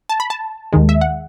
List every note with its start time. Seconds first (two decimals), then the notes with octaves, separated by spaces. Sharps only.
0.09 A5
0.20 B5
0.30 A5
0.73 D#2 D#3 G#3
0.89 E5
1.01 F#5